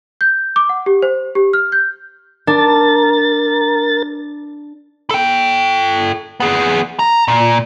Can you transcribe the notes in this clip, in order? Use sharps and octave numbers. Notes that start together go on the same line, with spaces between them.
G6
D6
F#5
G4
C5
G4
F6
G6
D4 A#4 A6
A4 G5
B3 G#4
A#5
A#2